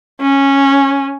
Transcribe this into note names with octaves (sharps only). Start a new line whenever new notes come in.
C#4